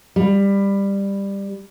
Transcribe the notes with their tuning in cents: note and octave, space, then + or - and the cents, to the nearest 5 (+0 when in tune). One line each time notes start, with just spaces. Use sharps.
G3 +15